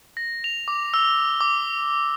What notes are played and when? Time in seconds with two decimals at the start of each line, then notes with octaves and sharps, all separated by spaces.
0.17 A#6
0.44 F7
0.68 D6
0.94 E6
1.41 D6